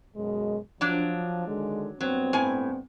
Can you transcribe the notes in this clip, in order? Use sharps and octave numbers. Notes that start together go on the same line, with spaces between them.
F#2 B2 G#3
F3 F#3 D4
D3 D#3 G#3
G2 F#3 B3 C4
A2 G#5